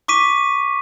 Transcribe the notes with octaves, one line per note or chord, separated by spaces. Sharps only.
C#6 D6 B6 D#7